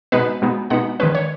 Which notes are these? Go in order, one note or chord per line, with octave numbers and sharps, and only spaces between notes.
B2 G#3 B3 D#4 B4
B2 G#3 B3 D#4
B2 G#3 B3 D#4 F#5
D#3 G#3 C#4 B4
C#5